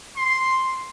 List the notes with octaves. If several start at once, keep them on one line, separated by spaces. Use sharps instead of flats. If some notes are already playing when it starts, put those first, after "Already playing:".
C6